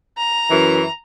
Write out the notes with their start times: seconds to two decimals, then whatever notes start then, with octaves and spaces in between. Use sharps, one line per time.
0.17 A#5
0.49 F#2 E3